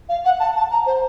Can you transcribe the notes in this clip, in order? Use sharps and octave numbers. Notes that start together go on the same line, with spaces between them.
F5
F#5
A5
A5
A#5
C5